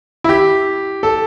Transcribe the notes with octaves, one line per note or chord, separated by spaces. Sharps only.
E4
G4
A4